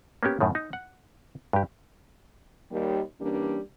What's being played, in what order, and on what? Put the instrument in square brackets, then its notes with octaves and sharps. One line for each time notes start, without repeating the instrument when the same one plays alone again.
[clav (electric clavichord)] A#3 B3 C#4 G4
F#2 A2 D#3
D#4
F#5
G2 G4
[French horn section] D#2 G3
E3 G3 A#3 C#4 D4